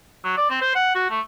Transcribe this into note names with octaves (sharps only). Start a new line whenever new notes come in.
F#3
D5
C4
C5
F#5
F#4
A3